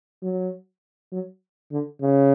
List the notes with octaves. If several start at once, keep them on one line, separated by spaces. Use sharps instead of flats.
F#3
F#3
D3
C#3